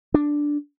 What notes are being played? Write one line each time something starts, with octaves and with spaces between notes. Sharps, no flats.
D4